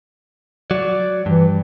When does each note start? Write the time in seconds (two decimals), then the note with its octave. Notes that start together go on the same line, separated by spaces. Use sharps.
0.71 F#3 D5
1.26 G2 E3